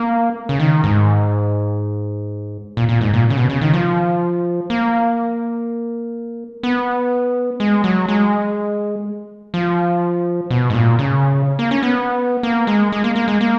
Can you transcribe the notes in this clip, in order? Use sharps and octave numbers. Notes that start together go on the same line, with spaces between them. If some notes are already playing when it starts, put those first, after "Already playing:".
Already playing: A#3
C#3
D#3
G#2
A#2
A#2
G#2
A#2
C#3
B2
C#3
D#3
F3
A#3
B3
G#3
F#3
G#3
F3
B2
G#2
A#2
C#3
A#3
C#4
B3
A#3
G#3
G#3
A#3
A#3
G#3
A#3